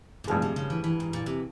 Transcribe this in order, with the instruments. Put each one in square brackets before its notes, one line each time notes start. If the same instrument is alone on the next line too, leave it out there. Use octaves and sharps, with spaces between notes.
[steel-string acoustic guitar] A#2
[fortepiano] G2 F3 G#3 [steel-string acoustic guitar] C3
[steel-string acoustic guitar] C3
C#3
E3
E3
G#2
A#2
C3